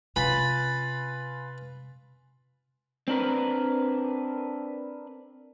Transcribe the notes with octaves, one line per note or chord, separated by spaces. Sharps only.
C3 C#4 F4 B4 G#5 B5 A6
C4 D4 A#4 B4